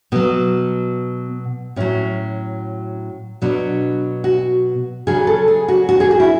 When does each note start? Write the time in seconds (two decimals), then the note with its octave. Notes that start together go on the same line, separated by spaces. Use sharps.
0.12 B2 F#3 B3
1.76 A2 F#3 C#4
3.42 B2 F#3 D4
4.24 F#4
5.07 C#3 F#3 G#4
5.27 A4
5.48 G#4
5.68 F#4
5.89 F#4
6.00 G#4
6.11 F#4
6.20 E4